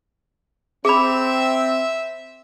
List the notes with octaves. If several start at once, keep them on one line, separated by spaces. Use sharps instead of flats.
C4 G#4 E5 B5